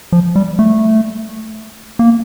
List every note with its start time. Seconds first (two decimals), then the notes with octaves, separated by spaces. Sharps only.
0.12 F3
0.36 G3
0.59 A3
1.99 A#3